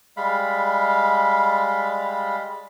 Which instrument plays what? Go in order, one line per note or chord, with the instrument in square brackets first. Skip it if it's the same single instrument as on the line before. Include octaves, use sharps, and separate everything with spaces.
[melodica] G3 G#3 F5 B5